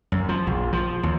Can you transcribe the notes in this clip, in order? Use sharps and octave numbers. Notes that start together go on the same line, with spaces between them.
F#2
F3
A#1
F3
D#2